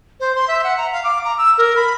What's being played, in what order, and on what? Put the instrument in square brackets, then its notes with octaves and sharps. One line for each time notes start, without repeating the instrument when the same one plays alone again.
[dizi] C5
C6
E5
F#5
A#5
F5
D6
A#5
E6
A#4
B5